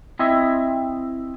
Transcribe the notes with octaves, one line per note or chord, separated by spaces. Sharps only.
C4 E4 D#5 E5